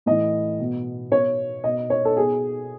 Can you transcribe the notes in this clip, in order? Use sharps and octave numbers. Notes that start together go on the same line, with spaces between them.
A2 E3 D#5
B2
B2 C#5
B2 D#5
C#5
A4
B2 G#4